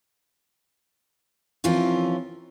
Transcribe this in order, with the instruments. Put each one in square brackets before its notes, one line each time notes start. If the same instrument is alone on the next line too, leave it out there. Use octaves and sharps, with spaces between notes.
[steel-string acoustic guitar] C3 E3 F3 C#4 F4 A#4